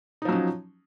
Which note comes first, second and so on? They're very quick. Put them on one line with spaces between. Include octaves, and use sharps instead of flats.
D#4 F3 F#3 C#4